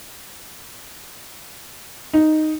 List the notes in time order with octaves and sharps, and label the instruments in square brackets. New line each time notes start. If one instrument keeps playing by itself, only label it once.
[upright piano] D#4